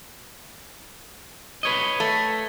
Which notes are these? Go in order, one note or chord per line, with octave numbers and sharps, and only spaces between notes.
B4 C#5 D#5
A3